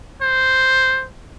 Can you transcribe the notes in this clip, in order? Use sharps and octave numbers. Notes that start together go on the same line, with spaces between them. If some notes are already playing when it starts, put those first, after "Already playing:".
C5